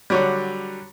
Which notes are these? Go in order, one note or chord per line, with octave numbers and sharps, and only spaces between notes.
D3 F#3 G3